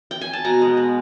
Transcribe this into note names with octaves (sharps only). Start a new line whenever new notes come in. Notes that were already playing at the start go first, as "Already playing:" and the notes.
G5
G#5
A5
B2 A#5
G#3
B3